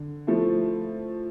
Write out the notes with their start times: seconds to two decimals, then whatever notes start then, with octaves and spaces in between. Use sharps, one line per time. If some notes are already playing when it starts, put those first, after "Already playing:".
Already playing: D3
0.27 F3 A3 E4